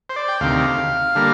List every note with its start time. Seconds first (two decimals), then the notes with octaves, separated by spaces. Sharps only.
0.09 C5
0.16 D5
0.28 G5
0.40 D2 C3 D#3 F5
1.15 D3 G3 A#3